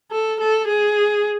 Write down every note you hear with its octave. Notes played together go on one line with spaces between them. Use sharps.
A4
A4
G#4